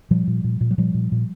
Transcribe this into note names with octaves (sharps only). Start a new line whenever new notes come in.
A#2 F3 G3
A#2
A#2
A#2
F#3
A#2 F3 G3
A#2
A#2